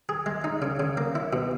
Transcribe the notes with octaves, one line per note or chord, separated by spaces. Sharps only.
G#4
G#3
D#4
C#3
C#3
A#3
E4
B2